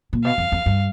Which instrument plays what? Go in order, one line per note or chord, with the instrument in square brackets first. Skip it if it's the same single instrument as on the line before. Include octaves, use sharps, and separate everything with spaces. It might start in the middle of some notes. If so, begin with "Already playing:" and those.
[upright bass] A#2
[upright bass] B2 [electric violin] F5
[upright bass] F2
F2
G2